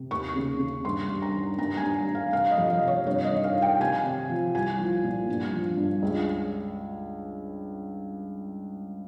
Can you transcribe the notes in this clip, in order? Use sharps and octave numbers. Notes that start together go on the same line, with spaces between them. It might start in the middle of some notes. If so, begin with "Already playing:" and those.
Already playing: C3
D#2 C#6
C#3
C#3
G2 C6
G2
A#5
D#3
G2 A#5
G#5
G2
G2
F5
C3 F5
D#5
F2
D#5
C3
C#5
G2 C#5
D#5
D#3
F5
D#3
G5
C3 G#5
C3
F3
C2 G#5
F3
A#2
G2
F3
G2
C#2